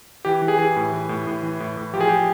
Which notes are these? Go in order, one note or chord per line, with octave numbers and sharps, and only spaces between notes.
E3 G4
E3
G#4
E3 G#4
A2
E3
A2
A2
E3
A2
A2
F3 G4
G#4
F3 G4